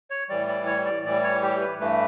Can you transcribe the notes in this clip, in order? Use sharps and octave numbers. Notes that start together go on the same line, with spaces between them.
C#5
A2 E3 G3 D5
D5
C#5
D5
A2 E3 G3 D5
C#5
G4
B4
G2 E3 A3 B4